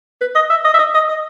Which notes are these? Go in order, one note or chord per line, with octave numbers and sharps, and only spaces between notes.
B4
D#5
E5
D#5
E5
D#5
D#5
D#5